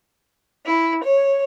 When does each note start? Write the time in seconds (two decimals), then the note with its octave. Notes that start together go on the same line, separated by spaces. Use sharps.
0.66 E4
1.03 C#5